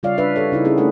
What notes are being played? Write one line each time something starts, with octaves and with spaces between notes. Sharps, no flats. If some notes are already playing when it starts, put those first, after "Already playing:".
C#3 G3 F4 C#5 D5 F5
D4 B4 E5
G4 A4 C#5
C#3 D#4 E4
A#3 C#4 E4 G#4
A3 D4 A4 F#5